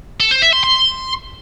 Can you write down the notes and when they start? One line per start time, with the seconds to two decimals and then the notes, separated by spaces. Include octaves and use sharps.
0.20 A4
0.31 C5
0.42 E5
0.53 C6
0.64 C6